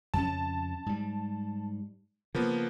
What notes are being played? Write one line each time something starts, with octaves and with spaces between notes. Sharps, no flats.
F2 C#3 C#4 A5
G#2 G3
C#3 F3 A#3 B3